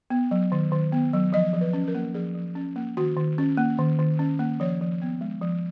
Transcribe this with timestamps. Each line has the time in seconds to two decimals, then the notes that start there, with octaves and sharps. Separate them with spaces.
0.10 B3
0.31 F#3
0.52 D#3
0.72 D#3
0.92 B3
1.13 F#3
1.33 F3 D#5
1.53 F3
1.61 B4
1.73 C#4
1.88 A#4
1.95 A#3
2.14 F3 G#4
2.35 F3
2.55 C#4
2.76 A#3
2.97 D#3 F#4
3.17 D#3
3.38 C#4
3.57 A#3
3.78 D#3
3.99 D#3
4.19 C#4
4.39 A#3
4.60 F3 C#5
4.81 F3
5.02 B3
5.21 G#3
5.41 F3